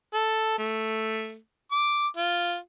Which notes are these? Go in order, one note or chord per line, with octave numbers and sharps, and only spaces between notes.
A4
A3
D6
F4